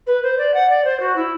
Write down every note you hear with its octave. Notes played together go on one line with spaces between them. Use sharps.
B4
C5
D5
F#5
D5
C5
F#4
E4